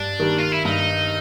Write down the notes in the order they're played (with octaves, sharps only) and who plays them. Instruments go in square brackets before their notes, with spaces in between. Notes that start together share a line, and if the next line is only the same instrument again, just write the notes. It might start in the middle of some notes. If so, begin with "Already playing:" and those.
Already playing: [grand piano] G2 [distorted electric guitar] D4
[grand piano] D#3 G3
[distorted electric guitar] F4
E4
[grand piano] G2 [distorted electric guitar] D#4